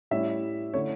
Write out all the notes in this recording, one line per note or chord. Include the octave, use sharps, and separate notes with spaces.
A2 G3 C#4 E4 E5
D3 A3 C#4 E4 C#5